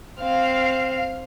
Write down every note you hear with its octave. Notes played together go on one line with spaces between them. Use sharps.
C4 F5